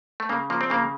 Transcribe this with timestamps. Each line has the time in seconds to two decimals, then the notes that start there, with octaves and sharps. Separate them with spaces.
0.20 A3
0.29 C#3 A#3
0.50 F3 A#3
0.61 C4
0.70 C#3 A#3